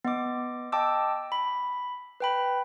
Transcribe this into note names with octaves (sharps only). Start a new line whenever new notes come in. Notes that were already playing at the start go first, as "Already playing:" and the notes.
B3 D#5 D6
D#5 G5 A5 D6 E6
B5
B4 G5 B5